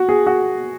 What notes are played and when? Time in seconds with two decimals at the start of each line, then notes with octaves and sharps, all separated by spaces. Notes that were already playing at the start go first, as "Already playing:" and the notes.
Already playing: F#4
0.09 G#4
0.27 F#4